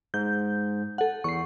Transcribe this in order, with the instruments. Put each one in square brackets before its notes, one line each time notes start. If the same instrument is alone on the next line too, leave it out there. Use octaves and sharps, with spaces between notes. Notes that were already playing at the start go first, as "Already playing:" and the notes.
[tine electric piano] G#2 [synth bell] G6
[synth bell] A4 F#5
[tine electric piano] E2 C7 [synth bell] C#6